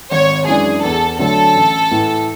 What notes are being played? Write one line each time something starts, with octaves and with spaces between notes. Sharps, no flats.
G#1 C#5
F#2 E3 G#3 D4 G#4
E2 A4
D3 F#3 A3 A4
A1
A2 E3